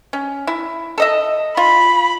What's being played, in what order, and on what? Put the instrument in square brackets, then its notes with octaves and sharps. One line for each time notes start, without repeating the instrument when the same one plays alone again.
[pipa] C#4
E4
A4 D#5 E5
[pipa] F4 [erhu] B5